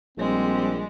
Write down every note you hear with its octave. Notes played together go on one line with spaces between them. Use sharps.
A#1 G3 G#3 C4